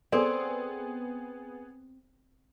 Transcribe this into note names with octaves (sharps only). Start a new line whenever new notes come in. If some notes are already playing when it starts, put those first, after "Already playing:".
B3 C4 G#4 A4 D5